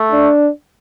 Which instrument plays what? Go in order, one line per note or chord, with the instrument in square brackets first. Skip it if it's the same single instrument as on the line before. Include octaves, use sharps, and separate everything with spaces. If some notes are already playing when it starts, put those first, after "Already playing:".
Already playing: [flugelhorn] A3
[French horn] D4